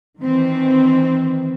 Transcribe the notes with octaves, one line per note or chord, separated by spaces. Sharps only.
D#3 E3 C4